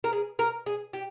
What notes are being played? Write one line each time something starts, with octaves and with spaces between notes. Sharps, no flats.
A#4
G#4
A#4
G#4
G4